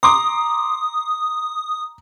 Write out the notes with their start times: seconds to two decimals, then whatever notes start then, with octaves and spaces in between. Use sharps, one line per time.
0.03 A#5 C6 D6 D#6